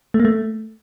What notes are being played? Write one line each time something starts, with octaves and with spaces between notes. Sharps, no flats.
A3
A#3
A3